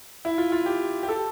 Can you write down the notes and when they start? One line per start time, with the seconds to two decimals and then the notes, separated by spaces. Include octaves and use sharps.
0.25 E4
0.38 F4
0.52 F4
0.66 G4
1.03 G4
1.08 A4